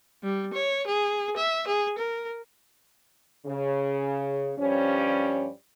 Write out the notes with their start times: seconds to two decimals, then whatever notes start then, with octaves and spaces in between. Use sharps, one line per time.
0.23 G3
0.53 C#5
0.86 G#4
1.36 E5
1.67 G#4
1.98 A#4
3.46 C#3
4.58 G2 F3 G3 C#4